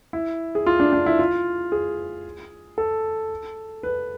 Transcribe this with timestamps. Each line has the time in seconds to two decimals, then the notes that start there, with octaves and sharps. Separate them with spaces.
0.13 E4
0.55 G#4
0.67 F4
0.80 D4
0.93 D4
1.06 E4
1.19 F4
1.72 G#4
2.78 A4
3.83 B4